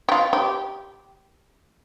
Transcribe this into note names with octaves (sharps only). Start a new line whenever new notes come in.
G4
F4
G4